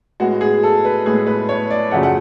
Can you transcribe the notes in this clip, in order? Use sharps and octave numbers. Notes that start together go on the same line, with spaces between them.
A2 G#3 B3 F#4
G#4
A4
B4
A2 G#3 B3 G#4
B4
C#5
D5
F#2 C#3 F3 A3 F#5
F#5